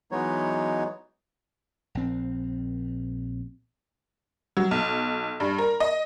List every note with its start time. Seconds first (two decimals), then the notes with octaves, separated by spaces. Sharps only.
0.12 E3 F#3 G#3 B3 D#4 C#5
1.95 A#1 C4
4.57 F#3
4.71 B1
5.40 G2
5.58 A#4
5.80 D#5